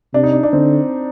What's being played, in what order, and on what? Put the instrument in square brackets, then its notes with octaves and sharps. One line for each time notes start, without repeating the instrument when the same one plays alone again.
[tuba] C3 [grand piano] D4
[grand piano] D#4
D4
D4
[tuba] D3 [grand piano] C4